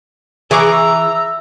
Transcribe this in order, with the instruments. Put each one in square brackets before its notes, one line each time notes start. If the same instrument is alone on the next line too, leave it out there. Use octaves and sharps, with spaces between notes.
[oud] E3 [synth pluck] G#4 C#6 D6 [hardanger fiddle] A#5 [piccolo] E6